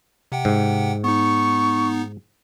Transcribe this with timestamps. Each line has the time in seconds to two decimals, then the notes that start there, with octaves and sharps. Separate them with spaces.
0.32 C3 F#5 G5
0.45 G#2
1.04 B3 D#4 C#6